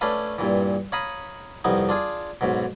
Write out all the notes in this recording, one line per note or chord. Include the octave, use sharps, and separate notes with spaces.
A3 C#4 D4 B4 F5
G2 A#2 E3
C#5 F5 A#5 B5 D#6
C2 F2 B3 D#4
D4 F4 G#4
B1 G#2 B2